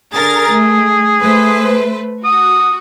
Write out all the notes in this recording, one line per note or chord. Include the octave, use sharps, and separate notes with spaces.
D3 G#4 A#4 A6
A3
A3 B4 C5
F#4 D#6